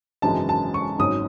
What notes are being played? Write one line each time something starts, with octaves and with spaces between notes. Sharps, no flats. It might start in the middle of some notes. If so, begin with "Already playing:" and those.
G#1 F#2 C#3 E3 G#3 A5
A5
C#6
G#1 G#2 F#3 C#4 D#6